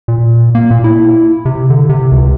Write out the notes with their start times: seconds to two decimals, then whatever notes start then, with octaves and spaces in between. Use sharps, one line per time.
0.08 A#2
0.55 A#3
0.71 A#2
0.84 E4
1.45 C3
1.70 D3
1.89 C3
2.12 C#2